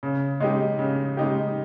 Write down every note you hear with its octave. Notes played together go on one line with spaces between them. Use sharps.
C#3
G#3 D#4 G4
C#3
G#3 D#4 G4